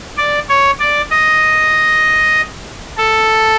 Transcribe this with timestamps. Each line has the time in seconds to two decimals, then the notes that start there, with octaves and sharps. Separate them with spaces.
0.18 D5
0.49 C#5
0.80 D5
1.11 D#5
2.98 A4